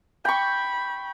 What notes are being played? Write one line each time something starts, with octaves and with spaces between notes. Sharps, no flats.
G5 B5 C#6